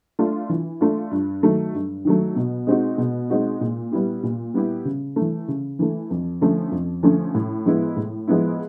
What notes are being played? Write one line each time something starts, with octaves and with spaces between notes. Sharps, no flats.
A3 D4 F4
E3
A3 D4 F4
G2
D#3 F#3 A3
G2
D#3 F#3 A3
B2
G#3 C4 D#4 F#4
B2
G#3 C4 D#4 F#4
A#2
G3 B3 E4 G4
A#2
G3 B3 E4 G4
C#3
A3
E3
C#3
E3 A3
F2
D3 F3 A3 C#4
F2
D3 F3 A3 C#4
A2
F3 G#3 B3 E4
A2
F3 G#3 B3 E4